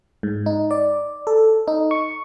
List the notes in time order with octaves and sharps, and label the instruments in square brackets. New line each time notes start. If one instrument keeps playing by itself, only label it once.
[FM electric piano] G#2
D#4
D5
A4
D#4
C#6